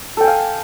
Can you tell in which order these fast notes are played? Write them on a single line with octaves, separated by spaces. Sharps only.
A4 G5 G#5 F5